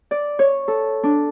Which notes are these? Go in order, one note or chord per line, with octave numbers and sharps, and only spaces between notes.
D5
C#5
A4
D4